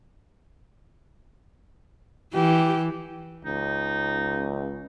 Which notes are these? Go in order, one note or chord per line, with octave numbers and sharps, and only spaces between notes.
E3 G4
C#2 D#4